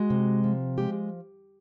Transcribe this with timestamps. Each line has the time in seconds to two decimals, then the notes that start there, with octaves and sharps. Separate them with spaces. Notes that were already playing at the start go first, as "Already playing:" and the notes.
Already playing: G#3 F#4
0.10 C3
0.44 F3
0.78 G#3 G4